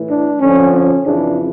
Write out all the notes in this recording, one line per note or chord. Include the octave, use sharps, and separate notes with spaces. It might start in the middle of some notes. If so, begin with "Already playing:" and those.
Already playing: A2 E3
D4
F2 D3 F3 C#4
C#4
F2 C#3 E3 D4